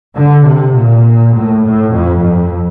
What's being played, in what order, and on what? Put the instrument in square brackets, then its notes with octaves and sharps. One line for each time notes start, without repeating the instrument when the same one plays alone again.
[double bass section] D3
C3
A#2
A2
A2
F2
F2